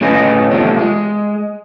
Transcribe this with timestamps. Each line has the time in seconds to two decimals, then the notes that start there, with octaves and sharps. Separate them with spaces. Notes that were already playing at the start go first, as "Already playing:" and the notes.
0.01 A2 C#4 G#4 B4 D#5
0.51 E2 C3 F3 G3 A3 C4
0.79 G#3